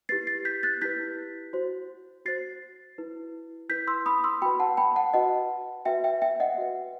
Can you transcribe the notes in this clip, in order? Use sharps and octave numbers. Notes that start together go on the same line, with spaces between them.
E4 G4 B4 A6 C7
A6 C7
G6 B6
F#6 A6
E4 G4 B4 G6 B6
F#4 C5
F#4 C5 A6 C7
E4 B4
E4 B4 G6 B6
C6 E6
B5 D#6
C6 E6
F#4 B4 G5 B5
F#5 A5
G5 B5
F#5 A5
F#4 B4 D#5 F#5
F#4 B4 E5 G5
E5 G5
E5 G5
D#5 F#5
F#4 B4